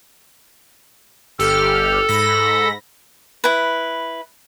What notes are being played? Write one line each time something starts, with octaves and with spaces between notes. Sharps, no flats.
G1 G4 A4 F6
G#2 B5 A#6
E4 B4